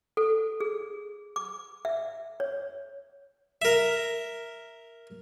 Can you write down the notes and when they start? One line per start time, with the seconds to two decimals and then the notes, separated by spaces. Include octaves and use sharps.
0.17 A4
0.61 G#4
1.36 D6
1.85 E5
2.40 C#5
3.62 A#4 E5